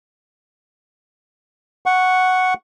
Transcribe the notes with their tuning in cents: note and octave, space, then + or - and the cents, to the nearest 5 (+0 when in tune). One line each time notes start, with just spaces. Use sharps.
F#5 +0 C#6 +0